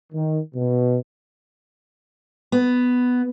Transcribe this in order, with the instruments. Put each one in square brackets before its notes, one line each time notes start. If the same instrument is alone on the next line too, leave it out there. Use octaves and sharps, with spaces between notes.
[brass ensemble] D#3
B2
[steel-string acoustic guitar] B3